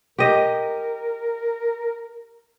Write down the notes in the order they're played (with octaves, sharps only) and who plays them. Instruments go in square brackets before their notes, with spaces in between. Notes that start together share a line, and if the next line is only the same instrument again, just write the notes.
[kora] G4 D#5 [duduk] A#4